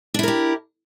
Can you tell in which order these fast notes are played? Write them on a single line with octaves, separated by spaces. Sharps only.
D4 E4 A#4 G4